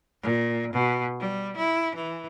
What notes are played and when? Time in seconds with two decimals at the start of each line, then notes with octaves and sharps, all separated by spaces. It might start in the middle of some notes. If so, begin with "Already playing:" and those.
0.23 A#2
0.73 B2
1.19 G3
1.56 E4
1.95 E3